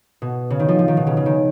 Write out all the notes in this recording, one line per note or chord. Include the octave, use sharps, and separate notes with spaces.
B2
C#3
D#3
F3
F3
D#3
B2
C#3
C#3
D#3